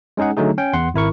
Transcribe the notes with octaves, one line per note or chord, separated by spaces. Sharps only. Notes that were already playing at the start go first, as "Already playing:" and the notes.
G#3 C#4 D#4 G#4 F#5
D3 F#3 A3 D#4 G#4
C#4 G5
E2 F#5 C6
G#1 E4 A#4 C#6